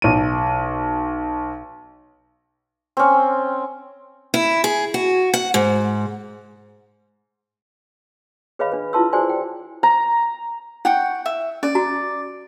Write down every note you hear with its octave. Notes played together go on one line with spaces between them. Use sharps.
B1 D#7
C4 C#4
E4
G#4
F#4
F#5
G#2
G#4 B4 C#5 D#5 F5 B5
D4 B4
E4 F4 B4 A5 C6 E6
F#4 G#4 C5 D5 G#5 C6
G5
A#5
E4 F#5 G5 C#6
E5
C#4 D5
F#4 A#5